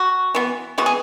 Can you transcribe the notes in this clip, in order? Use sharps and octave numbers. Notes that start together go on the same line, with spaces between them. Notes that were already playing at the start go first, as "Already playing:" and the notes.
Already playing: F#4
E3 B3
E3 G#3 B3 F#4
G#4